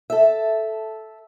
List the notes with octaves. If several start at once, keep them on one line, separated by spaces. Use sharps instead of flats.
A4 E5